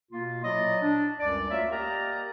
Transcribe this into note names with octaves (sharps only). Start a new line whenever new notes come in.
B2 A#3 F4
A#2 F#3 E4 D5 D#5
D4
C#2 F#2 G3 D5
D2 A#3 F4 C#5 E5
A#3 G4 A#4 D5 D#5 A#5